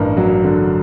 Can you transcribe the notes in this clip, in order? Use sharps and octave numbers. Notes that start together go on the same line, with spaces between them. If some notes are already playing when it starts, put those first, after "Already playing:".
Already playing: A1 G2 A#4
F#3
D3